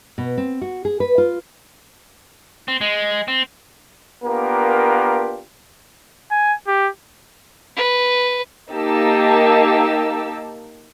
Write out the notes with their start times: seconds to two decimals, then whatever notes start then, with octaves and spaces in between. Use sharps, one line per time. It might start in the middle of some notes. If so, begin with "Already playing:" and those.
0.18 B2
0.38 C4
0.62 F#4
0.85 G#4
1.00 B4
1.18 F4
2.68 C4
2.81 G#3
3.28 C4
4.24 A#3 B3 D4 F4 G4 A#4
6.31 G#5
6.67 G4
7.76 B4
8.70 A#3 D#4 G4 A5 E6